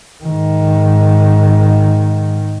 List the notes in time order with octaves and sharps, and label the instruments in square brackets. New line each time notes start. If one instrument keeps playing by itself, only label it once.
[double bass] G#2 D#3